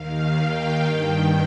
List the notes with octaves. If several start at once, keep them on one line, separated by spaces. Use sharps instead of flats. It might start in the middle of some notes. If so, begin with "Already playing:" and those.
Already playing: D#2 D#3 F5
G5
G2 D#3